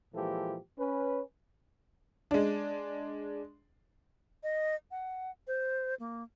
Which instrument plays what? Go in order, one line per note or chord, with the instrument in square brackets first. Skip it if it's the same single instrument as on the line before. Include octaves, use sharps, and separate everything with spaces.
[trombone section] A#2 E3 F3 G#3 G4 A4
C#4 B4
[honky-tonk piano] G#3 D4
[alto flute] D#5
F#5
C5
A#3